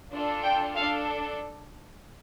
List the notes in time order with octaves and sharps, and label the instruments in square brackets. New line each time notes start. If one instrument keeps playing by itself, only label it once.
[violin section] D4 F4 A4
G5
D4 A4 F5